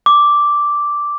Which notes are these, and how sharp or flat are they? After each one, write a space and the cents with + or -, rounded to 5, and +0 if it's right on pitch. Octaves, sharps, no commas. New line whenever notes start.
D6 -5